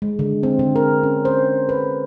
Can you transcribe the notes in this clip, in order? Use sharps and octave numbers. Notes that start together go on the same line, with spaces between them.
G#3
D3
C4
D3
A#4
C#4
C5
B4